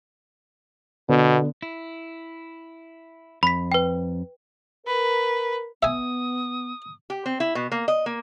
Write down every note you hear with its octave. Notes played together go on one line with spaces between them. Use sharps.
B2 D3 B3 B4
E4
F2 B5 B6
B4 G5
A#4 B4
B3 E5 G#5 D#6
G4
C4
E4
B2
A#3
D#5
A#3